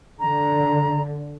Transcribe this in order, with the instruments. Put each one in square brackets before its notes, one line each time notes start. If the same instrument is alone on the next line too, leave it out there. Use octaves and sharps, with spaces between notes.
[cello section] D3 [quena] A#5